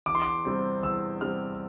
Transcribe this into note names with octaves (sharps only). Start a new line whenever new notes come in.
E2 D6
C6
D6
C3 G3 C4
E2 E6
C3 G3 C4 F6